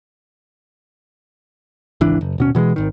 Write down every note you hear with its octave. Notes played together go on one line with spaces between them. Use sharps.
G#1 C#2 E3 D4
F#1
D#1 B2 C#4
B2 E3 G3 G#3
G#1 D#3